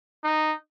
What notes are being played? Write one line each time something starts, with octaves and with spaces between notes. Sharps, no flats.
D#4